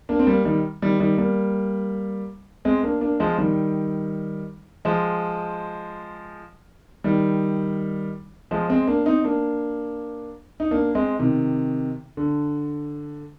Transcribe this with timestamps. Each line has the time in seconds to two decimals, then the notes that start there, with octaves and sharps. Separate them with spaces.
0.09 A#3 D4
0.19 C4
0.27 G3 A#3
0.45 D#3 G3
0.82 D#3 G3
1.00 D#3 G3
1.18 G3 A#3
2.65 G#3 C4
2.83 A#3 D4
3.01 A#3 D4
3.20 F3 G#3
3.38 D#3 G3
4.85 F3 G#3
7.04 D#3 G3
8.51 F3 G#3
8.69 G#3 C4
8.87 A#3 D4
9.06 C4 D#4
9.24 A#3 D4
10.60 D#4
10.71 A#3 D4
10.95 G#3 C4
11.19 C3 D#3
12.17 D3